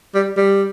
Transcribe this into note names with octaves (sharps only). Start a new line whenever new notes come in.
G3
G3